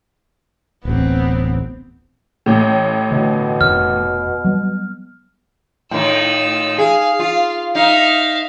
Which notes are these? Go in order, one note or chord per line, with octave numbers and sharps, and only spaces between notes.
D1 A1 B3 C4
A1 A2
B2 D3
F1 F2 D#3 F6
F#3 G3 B3
A2 D#3 F4 E6
G#4 F5
F4
D#4 E5 F5